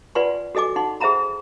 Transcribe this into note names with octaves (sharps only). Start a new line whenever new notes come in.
F4 B4 D5 F#5 G#5 C6
F#4 A4 D#5 G#5 D6
D#4 F#5 C6
G#4 C5 E5 F#5 A#5 B5